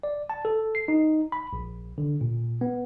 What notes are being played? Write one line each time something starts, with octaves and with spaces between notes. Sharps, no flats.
D5
A5
A4
C7
D#4
B5
A#1
D3
A#2
B3